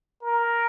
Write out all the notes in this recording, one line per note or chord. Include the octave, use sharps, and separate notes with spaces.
A#4